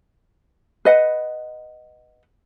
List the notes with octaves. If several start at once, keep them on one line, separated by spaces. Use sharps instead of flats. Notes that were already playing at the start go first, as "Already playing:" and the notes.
B4 D#5 F#5